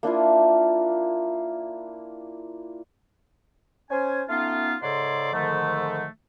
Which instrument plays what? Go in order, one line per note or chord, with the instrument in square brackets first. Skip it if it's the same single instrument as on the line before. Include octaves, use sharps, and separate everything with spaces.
[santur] A#3 D4 E4 F4
[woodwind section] C#4 C5 G#5
A3 B3 C#4 D#4 F4
G#2 C#3 A4 C#5 D5 C6
G#2 D3 D#3 F3 A3